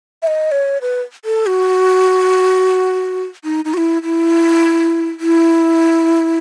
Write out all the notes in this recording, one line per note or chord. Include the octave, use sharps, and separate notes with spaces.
E5
D#5
C#5
B4
A4
F#4
D#4
D#4
F#4
E4
E4
E4